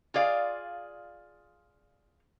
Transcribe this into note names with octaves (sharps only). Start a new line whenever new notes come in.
F4 G#4 D5 F5